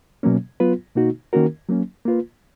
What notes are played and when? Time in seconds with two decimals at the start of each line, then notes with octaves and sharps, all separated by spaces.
0.23 B2 F#3 A#3 C#4
0.60 F#3 B3 F4 B4
0.96 B2 A#3 D#4 F#4
1.33 D#3 A#3 C#4 F#4 A#4
1.69 F#3 A#3 C#4
2.06 A#3 F4 B4